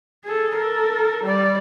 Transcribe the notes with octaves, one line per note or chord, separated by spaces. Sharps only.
G#4 A4
A4 A#4
G3 D5